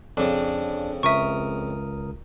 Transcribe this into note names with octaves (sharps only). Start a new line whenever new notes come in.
F2 C#3 D4
C#2 A#4 E5 C#6 D#6